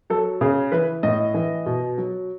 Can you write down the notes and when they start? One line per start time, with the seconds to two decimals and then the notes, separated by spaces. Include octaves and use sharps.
0.10 F#3 A4
0.41 C#3 G#4
0.72 E3 B4
1.03 A2 D#5
1.34 E3
1.66 B2
1.98 F#3